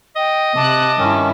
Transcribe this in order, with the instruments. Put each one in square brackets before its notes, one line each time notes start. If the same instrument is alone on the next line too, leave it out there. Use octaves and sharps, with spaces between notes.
[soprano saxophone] D#5 [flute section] G5
[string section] C3 F#6 [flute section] A5 D6
[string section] G2 E4 [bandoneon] D#3 C#4